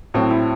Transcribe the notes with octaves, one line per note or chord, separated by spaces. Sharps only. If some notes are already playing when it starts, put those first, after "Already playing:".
A2 F#3 C4 F#4
E4